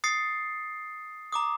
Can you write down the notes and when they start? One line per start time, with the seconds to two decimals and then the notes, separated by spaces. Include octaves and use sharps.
0.04 D#6 A6 C7 C#7
1.32 A#5 D6 D#6